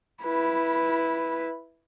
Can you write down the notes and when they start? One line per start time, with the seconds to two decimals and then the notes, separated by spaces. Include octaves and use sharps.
0.22 E4 B4